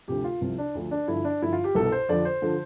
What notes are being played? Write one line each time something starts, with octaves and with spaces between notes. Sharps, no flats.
D2 C3 F3 G4
F4
C2 C3 F3
D4
D2 D3 F3
D4
G2 D3 F3 E4
D4
G2 D3 F3 E4
F4
G4
C2 B2 A4
C5
F2 D3 F3 D5
C5
D3 F3